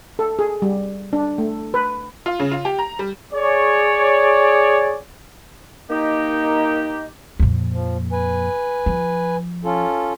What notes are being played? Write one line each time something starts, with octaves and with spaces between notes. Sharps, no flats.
A4
G#4
G3
D4
A3
B4
F4
C#3
F4
G4
A#5
G3
G#4 C#5 D5
A#3 D#4 G4 D#5
F2 A#2
F3
B4 G#5
F3
C#4 F4 A4